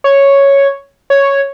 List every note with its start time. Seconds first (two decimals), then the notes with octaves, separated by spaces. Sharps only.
0.04 C#5
1.10 C#5